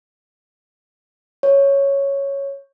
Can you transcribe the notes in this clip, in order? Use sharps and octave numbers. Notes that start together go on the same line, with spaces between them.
C#5